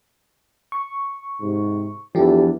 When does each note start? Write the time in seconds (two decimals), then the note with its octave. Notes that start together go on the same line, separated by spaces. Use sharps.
0.72 C#6
1.41 G#2 C3
2.15 E2 F3 D4 E4 G4 A4